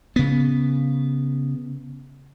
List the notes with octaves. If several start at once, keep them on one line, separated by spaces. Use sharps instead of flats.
C#3 B3